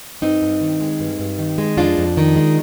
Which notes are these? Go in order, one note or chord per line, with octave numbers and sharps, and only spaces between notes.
G2 C4 D#4
G2
D#3
G#3
G2
G2
D#3
G#3
F2 D4 F4
F2
D#3
G#3